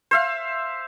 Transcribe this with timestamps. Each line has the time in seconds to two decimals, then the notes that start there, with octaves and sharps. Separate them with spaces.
0.11 C5 E5 F5